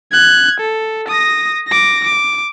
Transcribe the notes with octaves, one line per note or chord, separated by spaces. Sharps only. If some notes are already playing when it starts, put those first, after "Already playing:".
F#6 G#6
A4
D#6 A#6
D6 A#6
D6